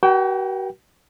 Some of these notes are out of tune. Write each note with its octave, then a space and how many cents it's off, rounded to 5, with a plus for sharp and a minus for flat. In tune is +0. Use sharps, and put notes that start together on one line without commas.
F#4 +40 A#4 +45 G5 +5